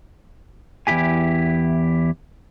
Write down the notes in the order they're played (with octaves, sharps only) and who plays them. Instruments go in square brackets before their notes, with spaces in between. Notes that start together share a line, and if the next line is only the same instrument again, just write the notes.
[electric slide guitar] E2 G#2 E4 G4 G#5